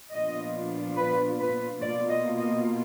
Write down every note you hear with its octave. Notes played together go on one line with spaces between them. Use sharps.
A#2 F3 B3 D4 F4 D#5
B4
B4
B2 A#3 F4 D5
D#5
D#5